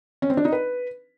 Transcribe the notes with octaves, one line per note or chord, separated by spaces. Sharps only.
C#4
C4
D4
D#4
B4